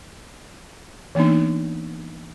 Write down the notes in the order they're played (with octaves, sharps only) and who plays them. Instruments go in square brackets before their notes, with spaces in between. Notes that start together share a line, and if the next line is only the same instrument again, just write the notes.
[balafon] E3 A#3 B3 D4 D#4